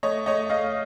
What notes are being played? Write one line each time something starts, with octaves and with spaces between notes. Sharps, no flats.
A3 C#5 D#5
A3 C#5 D#5
A3 D#5 F5